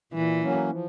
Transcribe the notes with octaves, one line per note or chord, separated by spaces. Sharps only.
A#2 E3
F#3 A#3 C#4
F3